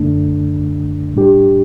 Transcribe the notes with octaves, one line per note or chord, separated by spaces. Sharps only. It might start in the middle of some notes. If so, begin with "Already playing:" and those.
Already playing: F#2 D3 A3 D4
A2 G3 D4 G4